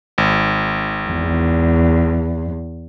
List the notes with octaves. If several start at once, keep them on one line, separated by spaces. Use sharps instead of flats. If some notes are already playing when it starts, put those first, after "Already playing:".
G#1
E2